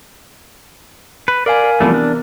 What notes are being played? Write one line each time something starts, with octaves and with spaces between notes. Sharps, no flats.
B4
A#4 D5 F5 G#5
A#4
C3 E3 F3 G3 A3 B3
D4